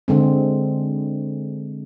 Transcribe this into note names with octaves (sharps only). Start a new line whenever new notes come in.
D3 G#3 C4